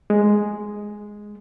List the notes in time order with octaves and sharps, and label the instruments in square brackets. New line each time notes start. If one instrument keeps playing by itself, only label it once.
[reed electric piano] G#3